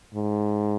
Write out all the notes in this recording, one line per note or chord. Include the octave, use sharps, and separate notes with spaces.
G#2